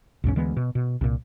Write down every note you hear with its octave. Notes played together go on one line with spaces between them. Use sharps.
B1 E2 G#2 C#4
D2 E3 G#3 B3
B2
B2
C2 A#2